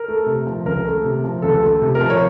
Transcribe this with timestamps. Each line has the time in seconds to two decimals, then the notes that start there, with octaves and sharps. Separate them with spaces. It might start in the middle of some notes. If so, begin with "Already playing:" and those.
Already playing: A#4
0.08 A3
0.26 C3
0.46 F3
0.65 C#2 A#4
0.85 A3
1.04 C3
1.24 F3
1.42 C#2 A4
1.63 A3
1.82 C3
1.95 A#4
2.01 F3
2.10 C#5